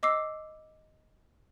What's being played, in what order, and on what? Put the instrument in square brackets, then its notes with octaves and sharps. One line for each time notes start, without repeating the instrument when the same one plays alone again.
[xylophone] D#5 D6 E6 C7